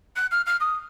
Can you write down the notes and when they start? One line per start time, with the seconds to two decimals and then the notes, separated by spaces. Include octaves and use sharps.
0.16 F#6
0.31 F6
0.46 F6
0.60 D#6